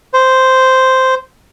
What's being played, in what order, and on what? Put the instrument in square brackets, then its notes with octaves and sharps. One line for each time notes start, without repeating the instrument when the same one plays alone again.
[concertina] C5